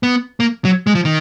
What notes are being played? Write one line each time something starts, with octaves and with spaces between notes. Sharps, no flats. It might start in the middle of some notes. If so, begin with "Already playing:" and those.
B3
A#3
F#3
G#3
F3
D#3